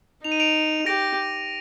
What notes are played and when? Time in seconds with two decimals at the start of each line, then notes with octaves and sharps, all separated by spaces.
0.24 D#4 F7
0.32 D#7
0.40 D7 F7
0.86 G4 A#6 D7